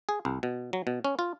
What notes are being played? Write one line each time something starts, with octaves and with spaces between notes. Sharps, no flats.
G#4
C2
B2
F#3
B2
C#4
F4